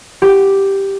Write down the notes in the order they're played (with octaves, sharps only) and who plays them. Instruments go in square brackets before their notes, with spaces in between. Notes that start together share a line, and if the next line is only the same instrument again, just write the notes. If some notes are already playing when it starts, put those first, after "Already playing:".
[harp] G4